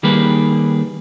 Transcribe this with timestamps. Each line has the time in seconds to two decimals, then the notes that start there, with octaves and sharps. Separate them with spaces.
0.03 D#3 G3 A#3 G4 G#4 B4